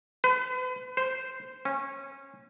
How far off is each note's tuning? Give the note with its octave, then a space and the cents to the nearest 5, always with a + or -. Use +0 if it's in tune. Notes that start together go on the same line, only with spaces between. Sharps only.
B4 +40
C5 -10
C#4 -20